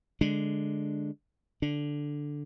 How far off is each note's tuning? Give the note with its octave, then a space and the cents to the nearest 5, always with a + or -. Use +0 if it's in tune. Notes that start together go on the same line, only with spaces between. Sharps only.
D3 +0 G#3 +0 D4 +0
D3 +0 D4 +0